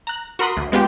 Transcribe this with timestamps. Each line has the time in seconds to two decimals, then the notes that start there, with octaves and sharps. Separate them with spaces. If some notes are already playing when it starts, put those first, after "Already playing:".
0.07 A#5 F#6
0.39 F#4 A#4 B5 C6 D#6
0.57 D2
0.72 G#3 B3 F4 G4